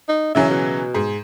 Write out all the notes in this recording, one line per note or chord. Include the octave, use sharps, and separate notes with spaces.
D#4
C#3 E3 F#3 E5
B2
G#2